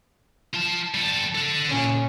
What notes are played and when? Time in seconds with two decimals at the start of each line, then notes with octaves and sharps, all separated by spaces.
0.54 F4 A5
0.94 G3 A4
1.35 A4 F#5
1.69 A#2 C#4